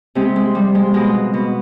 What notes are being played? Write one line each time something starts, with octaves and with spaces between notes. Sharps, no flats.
C3 G#3 C4
G#3
F3 G3
G#3
B2 G#3
B2